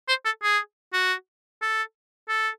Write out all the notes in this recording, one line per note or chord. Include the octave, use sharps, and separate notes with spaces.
C5
A4
G#4
F#4
A4
A4